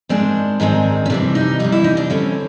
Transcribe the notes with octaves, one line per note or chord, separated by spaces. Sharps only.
G#2 D#3 G#3 C4 D4
G#2 D#3 G#3 C4
C#4
C3 E3 G3 D4
D#4
C3 E3 G3 D#4
E4
D#4
D4
D3 G3 C4 C#4